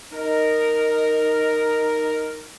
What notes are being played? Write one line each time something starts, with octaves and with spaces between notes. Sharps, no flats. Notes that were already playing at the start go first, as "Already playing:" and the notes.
D#4 A#4